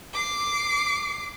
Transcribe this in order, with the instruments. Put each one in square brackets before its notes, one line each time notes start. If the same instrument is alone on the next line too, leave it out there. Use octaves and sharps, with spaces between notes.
[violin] D6 C7